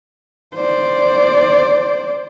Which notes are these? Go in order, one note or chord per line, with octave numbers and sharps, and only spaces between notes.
C5 D5